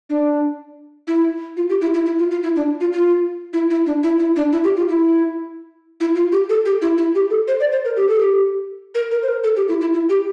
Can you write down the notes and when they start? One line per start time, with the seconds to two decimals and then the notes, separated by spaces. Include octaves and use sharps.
0.10 D4
1.07 E4
1.57 F4
1.70 G4
1.81 E4
1.94 E4
2.06 E4
2.19 F4
2.31 F4
2.43 E4
2.56 D4
2.81 F4
2.93 F4
3.53 E4
3.70 E4
3.86 D4
4.03 E4
4.19 E4
4.36 D4
4.53 E4
4.64 G4
4.77 F4
4.89 E4
6.00 E4
6.16 F4
6.32 G4
6.49 A4
6.65 G4
6.82 E4
6.98 E4
7.15 G4
7.30 A4
7.48 C5
7.60 D5
7.72 C5
7.85 A#4
7.97 G4
8.09 A4
8.20 G4
8.95 A#4
9.11 A#4
9.23 C5
9.28 A#4
9.44 A4
9.57 G4
9.68 E4
9.81 E4
9.94 E4
10.09 G4